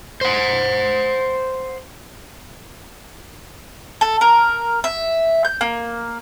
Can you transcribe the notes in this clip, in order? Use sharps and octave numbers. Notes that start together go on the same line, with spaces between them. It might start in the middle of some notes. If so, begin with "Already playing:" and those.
C5 F#5
A4
A#4
E5
G6
A#3